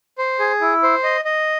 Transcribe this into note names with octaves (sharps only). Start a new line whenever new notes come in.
C5
G#4
E4
C5
D#5
D#5